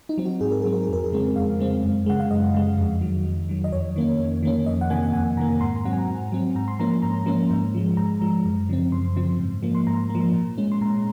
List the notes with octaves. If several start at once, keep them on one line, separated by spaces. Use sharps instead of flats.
D#4
F#3 C4
F#4
G#2 G#4
A#4
F#3 C4 G#4
A#4
G#4
F2 A#4
G#4
C#3 G#3 C4
F2 F5
C#3 G#3 C4
F#2
C#3 G#3 F#5
F5
F#2 D#5
C#3 G#3
F2
D#3 F#3
F2
D#3 F#3
D#5
F2 C#5
D#3 A#3 C#4
F2
D#3 A#3 C#4
F2 D#5
F#5
C3 D#3 A#3 G#5
F#5
F2 G#5
C3 D#3 A#3 A#5
G#2 C6
A#5
F#3 C4 F#5
G#5
G#2
F#3 C4
G#2 A#5
C6
F3 A#3 C#4 A#5
A#5
G#2 A#5
F3 A#3 C#4
G#2
F3 G#3
G#2 A#5
F3 G#3
F#2
C#3 F3 C4
F#2 C6
C#3 F3 C4
G#2
F3 A#3
C6
G#2 A#5
A#3
F3
A#2
G#3 C#4
C6
A#2 A#5